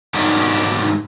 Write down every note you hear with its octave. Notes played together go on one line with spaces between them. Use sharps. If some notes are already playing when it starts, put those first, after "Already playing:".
G#2 D#3 F#3 B3 D4 G4